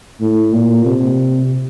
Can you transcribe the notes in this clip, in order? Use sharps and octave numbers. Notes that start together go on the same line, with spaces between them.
A2
A#2
C3